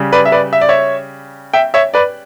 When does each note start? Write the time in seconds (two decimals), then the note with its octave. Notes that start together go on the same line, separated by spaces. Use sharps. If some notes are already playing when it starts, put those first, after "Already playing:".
Already playing: C#3 G3
0.13 B4 D5
0.25 E5
0.32 B4 D5
0.53 E5
0.61 D5
0.69 C#5 E5
1.54 E5 G5
1.74 C#5 E5
1.94 B4 D5